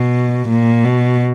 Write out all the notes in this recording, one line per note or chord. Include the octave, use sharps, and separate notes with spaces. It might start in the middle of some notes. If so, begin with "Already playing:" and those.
Already playing: B2
A#2
B2